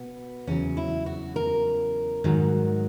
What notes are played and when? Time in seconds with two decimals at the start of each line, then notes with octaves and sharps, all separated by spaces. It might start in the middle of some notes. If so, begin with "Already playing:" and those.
Already playing: B2 B3
0.47 E2 C#3 F#3 C#4
0.77 E4
1.06 F#4
1.36 A#4
2.24 G#2 D#3 F#3